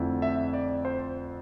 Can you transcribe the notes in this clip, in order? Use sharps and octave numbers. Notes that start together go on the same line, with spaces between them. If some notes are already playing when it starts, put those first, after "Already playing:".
Already playing: F2 D3 A3 C4 E4
E5
D5
C5